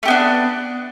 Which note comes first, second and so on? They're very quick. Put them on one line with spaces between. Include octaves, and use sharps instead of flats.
A3 G4 B3 D4